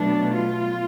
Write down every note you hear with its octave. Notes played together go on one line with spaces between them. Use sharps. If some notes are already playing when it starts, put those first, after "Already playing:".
Already playing: B2 F#3 A3 D4
F4